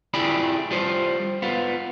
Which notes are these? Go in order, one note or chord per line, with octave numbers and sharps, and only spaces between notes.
E4 F4 G4 G#4 D5 B5
G3 F4 C5
B3 F4